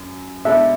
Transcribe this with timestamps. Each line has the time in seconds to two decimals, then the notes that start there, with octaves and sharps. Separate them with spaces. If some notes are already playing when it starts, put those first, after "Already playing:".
Already playing: F#2
0.45 B2 G#3 D4 A4 E5